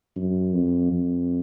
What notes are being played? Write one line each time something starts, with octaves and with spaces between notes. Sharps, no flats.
F#2
F2
F2